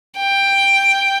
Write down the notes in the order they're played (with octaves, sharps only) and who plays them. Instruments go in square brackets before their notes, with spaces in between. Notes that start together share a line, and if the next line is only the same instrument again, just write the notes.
[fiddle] G5